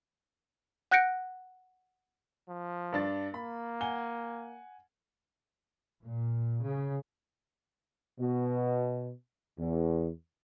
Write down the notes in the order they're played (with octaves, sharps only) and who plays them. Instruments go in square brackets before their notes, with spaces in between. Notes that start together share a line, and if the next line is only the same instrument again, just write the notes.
[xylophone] F#5 F#6 G6 A#6 C#7 D7
[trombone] F3
[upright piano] G2 D4 A6
[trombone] A#3 [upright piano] B5
[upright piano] F#5 G#5 G7
[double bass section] A#2
C#3
[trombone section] B2
E2